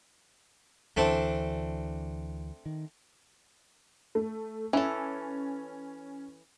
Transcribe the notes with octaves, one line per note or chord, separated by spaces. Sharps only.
D2 E3 A3 C4 D4
D#3
A3
E3 C#4 A4